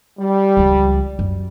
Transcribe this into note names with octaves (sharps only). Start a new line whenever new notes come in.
G3
C#2 F3
F#2